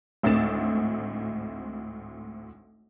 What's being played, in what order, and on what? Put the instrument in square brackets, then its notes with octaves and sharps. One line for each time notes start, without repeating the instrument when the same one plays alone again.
[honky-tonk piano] G#1 D2 A2 C4 A6 E7